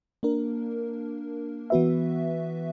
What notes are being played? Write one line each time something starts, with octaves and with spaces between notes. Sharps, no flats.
A#3 D4 A#4
E3 B3 F#4 B4 E5